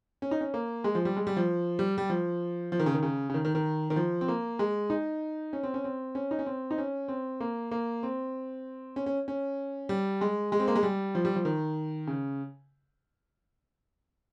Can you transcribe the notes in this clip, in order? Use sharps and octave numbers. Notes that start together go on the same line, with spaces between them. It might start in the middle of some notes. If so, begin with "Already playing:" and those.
C#4
D#4
C#4
A#3
G#3
F3
G3
G#3
G3
F3
G3
G3
F3
F3
D#3
C#3
D#3
C#3
C#3
D#3
D#3
D#3
D#3
F3
C4
A#3
G#3
D#4
C#4
C4
C#4
C4
C#4
D#4
C#4
C4
D#4
C#4
C4
A#3
A#3
C4
C#4
C#4
C#4
G3
G#3
G#3
C4
A#3
G#3
G3
F3
G3
F3
D#3
C#3